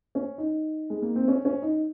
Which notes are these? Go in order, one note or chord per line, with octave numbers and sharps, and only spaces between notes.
C#4
D#4
G#3
A#3
C4
C#4
C#4
D#4